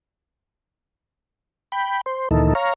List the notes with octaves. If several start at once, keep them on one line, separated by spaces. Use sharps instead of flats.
G5 B5
C5
D2 A#2 D#3 E3 D#4 A4
C#5 F5 A#5